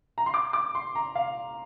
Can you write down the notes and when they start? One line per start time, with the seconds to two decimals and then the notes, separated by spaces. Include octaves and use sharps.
0.18 A#5
0.26 C6
0.34 D6
0.53 D6
0.75 C6
0.95 A#5
1.15 F5